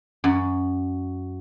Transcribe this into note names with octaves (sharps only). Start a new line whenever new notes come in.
F#2